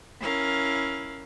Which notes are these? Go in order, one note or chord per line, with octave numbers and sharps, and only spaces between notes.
C#4 E4 A#4 F5